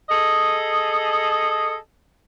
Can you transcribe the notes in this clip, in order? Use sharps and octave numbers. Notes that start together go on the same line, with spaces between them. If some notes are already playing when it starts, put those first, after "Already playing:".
G#4 A4 D#5